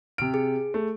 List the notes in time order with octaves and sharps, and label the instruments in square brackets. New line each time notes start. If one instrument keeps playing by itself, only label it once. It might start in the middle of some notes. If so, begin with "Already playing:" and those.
[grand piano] C3 D7 [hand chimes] F6
[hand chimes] G#4
[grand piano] A3